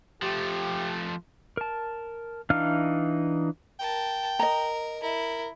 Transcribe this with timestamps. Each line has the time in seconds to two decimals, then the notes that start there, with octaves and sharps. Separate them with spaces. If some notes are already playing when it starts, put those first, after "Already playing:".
0.22 F3 A3 G4
1.57 A#4 A5
2.50 E3 D4 D#4 F5 F6
3.80 A#4 G5 A5
4.39 A#4 D#5 A#5
5.03 E4 A#4